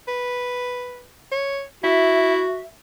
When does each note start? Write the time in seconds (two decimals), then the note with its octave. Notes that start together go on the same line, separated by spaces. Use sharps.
0.08 B4
1.32 C#5
1.84 E4 F#4 E5